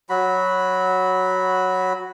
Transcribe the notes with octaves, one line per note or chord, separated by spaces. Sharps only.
F#3 F#4 B5